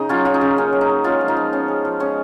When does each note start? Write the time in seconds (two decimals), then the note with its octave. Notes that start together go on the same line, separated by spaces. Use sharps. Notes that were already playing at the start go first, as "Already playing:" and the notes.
Already playing: C#3 D#4
0.09 F#3 C#4 F4
0.25 C#4 F4
0.34 D#4
0.41 C#3
0.57 A#3 C#4
0.73 F#3
0.81 D#4
0.89 C#4
1.04 G#3 C#4 F4
1.21 F3
1.28 D#4
1.37 F3
1.53 B3 C#4
1.68 G#3
1.85 F3
2.00 G#3 C#4